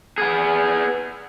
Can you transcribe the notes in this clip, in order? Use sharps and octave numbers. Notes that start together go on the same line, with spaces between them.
B3 G#4